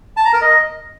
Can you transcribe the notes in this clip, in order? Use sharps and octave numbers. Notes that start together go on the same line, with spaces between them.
A5
A#5
A#4
D#5